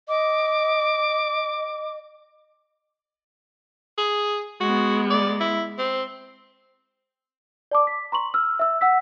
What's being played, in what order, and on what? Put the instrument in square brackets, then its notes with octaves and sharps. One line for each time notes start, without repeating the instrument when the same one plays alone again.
[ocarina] D#5 [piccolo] D6
[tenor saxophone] G#4
[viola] G#3 B3 [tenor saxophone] F#4
[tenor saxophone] D5
E4
C4
[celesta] D5 A5 D6
B6
A#5 C6 C#6 F#7
E6 F6
E5 E6
F#5 E6 B6